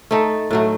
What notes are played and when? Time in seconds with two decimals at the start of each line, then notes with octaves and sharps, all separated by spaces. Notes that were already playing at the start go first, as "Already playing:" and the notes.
0.11 A3 D#4 A4
0.51 A2 F#3 A3